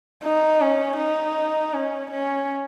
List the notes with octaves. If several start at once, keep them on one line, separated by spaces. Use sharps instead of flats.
D#4
C#4
D#4
C#4
C#4